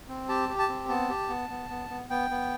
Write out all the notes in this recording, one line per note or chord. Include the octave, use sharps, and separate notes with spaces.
C4
G4 A5
G4
A5
C4
B3 A5
G4
B3
B3
B3
B3
B3 G5
B3